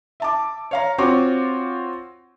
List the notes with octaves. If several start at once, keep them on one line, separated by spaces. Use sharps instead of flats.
E5 A5 D6
C#5 F5 A#5
C4 F4 F#4 C#5 C#6 D6